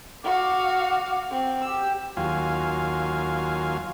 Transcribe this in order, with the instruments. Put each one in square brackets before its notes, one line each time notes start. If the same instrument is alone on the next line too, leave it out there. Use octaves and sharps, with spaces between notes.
[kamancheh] F#4 F5 [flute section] F#5 D6
[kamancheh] C4
[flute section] G4 [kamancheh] E6
[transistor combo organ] D#2 F#3 F4 F5 G#5